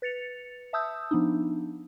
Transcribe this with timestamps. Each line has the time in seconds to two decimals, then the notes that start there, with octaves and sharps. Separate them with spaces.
0.02 B4 A6 C#7 F7
0.73 E5 A5 D#6 E6 G6
1.11 F3 B3 D4 D#4